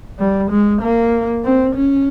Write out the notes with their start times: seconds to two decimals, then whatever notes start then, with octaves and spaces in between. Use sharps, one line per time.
0.19 G3
0.50 G#3
0.81 A#3
1.44 C4
1.75 C#4